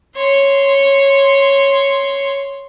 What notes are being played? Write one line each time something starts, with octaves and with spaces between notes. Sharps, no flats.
C#5 C6